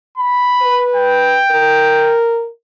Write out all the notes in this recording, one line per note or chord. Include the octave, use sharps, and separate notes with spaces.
B5
B4
G5
A#4